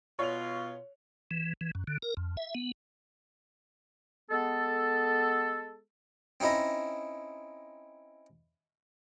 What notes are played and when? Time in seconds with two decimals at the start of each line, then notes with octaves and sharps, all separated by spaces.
0.19 B2 F4 C#5 F7
1.31 E3
1.61 E3
1.75 F#2
1.87 D3
2.02 A#4
2.17 F2
2.37 E5
2.55 B3
4.30 G#3 B3 A4
6.40 C4 C#4 D#4 E4 D#5